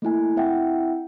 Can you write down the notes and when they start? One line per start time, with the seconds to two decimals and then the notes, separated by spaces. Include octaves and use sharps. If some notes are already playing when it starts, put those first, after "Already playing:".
0.02 A3 A#3 E4 G#5
0.36 C4 E4 E5 F#5 G5